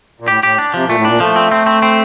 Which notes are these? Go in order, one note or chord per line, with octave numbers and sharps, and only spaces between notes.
A#2
A2 G4
A2 G4
D4
C3 F3
A#2 A3
A2
A#2 D4
F3 A3
C4
C4
C4
C4